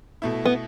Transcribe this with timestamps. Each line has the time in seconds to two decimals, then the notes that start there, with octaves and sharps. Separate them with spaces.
0.22 B2 A3 E4
0.46 B3